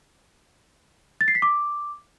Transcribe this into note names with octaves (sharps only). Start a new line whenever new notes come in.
A6
C7
B6
D6